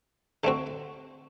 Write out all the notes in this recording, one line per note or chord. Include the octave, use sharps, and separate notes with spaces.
D3 A3 C4 F#4